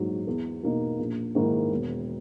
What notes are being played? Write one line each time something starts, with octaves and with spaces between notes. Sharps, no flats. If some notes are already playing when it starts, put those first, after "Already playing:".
Already playing: A#1 G#2 F#3
E2
B2 A#3 D#4
A#1
G#2 D#3 A#3 E4
E1